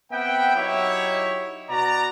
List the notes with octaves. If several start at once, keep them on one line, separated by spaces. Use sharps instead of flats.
B3 C4 E5 F#5 G5
F#3 D#4 E4 G4 C#5 E5
B2 F#4 D5 A#5